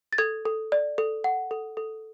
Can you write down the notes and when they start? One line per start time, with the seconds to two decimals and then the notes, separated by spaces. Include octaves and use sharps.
0.13 A6
0.18 A4 G#6
0.46 A4
0.72 D5
0.98 A4
1.24 F#5
1.51 A4
1.77 A4